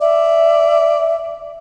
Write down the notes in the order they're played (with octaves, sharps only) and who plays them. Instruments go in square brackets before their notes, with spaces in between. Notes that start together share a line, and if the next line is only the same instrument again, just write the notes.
[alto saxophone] D5 [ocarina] E5